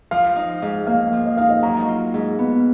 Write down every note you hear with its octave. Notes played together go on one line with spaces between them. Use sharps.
F3 F5
D#4
G#2
A#3 F5
F3
D#5
D#4 F5
D#5
F#3 A#5
F4
G#2
B3